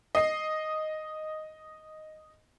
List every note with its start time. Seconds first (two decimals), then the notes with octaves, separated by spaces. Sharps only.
0.15 D#5 C7